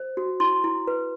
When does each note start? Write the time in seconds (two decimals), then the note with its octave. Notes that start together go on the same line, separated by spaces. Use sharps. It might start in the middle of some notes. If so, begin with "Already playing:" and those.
Already playing: C5
0.17 F#4
0.40 E4 C6
0.64 E4
0.87 B4